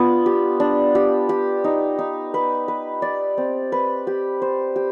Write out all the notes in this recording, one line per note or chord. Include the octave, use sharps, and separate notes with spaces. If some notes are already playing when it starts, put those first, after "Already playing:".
Already playing: B3 D4 F4
G4
D4
G4
G4
D#4
D#4
B4
B4
D5
C4
B4
G4
C5
G4